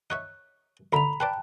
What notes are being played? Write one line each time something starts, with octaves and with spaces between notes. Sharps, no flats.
D#4 C#5 E5 F#6
D2 D3 E5 A#5 B5 F7
B4 C5 D5 G5 A5 F#6